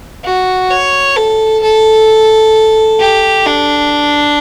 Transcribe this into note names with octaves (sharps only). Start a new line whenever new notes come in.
F#4
C#5
A4
A4
G4
D4